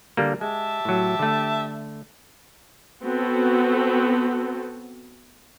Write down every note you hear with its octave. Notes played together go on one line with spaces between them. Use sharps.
D3 G3 A#3
G#3 G4 E5 A5
A2 F#3
D3 A3
B3 C4 F#4 A4